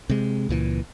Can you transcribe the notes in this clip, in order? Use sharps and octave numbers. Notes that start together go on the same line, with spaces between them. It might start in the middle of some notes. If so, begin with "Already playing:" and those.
C3 G#3
C#2 A#2 E3